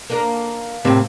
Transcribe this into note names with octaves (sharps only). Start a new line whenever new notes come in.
A#3 D4 A#4
A2 C3 A#3 C4